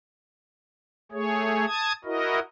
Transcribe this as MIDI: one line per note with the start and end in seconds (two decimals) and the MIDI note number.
1.12 1.65 57
1.12 1.65 68
1.12 1.65 73
1.67 1.92 81
1.67 1.92 87
1.67 1.92 92
2.05 2.39 64
2.05 2.39 66
2.05 2.39 70
2.05 2.39 75